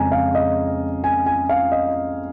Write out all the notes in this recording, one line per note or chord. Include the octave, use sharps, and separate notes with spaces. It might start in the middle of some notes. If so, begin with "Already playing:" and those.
Already playing: F2 C#3 G#3 C#4 G#5 A#5
F5
D#5
G#5
G#5
F5
D#5